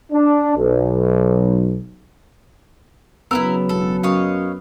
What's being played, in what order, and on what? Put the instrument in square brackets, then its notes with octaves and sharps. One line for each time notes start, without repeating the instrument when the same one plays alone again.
[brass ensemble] D4
B1
[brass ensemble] C#3 F#3 [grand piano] B3 E6 [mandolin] E4 F4 A#4
[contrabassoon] E1 [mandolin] A4
[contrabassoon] F#2 [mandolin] C#5 D#5 F5